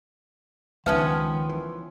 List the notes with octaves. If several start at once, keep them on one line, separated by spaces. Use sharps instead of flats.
C#2 D#3 F3 B3 C#4 D#4 B4 E5
E3